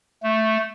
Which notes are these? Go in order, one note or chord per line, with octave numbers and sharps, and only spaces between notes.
A3